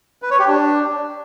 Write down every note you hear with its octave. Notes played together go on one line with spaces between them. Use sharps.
B4
C#5
G4
D4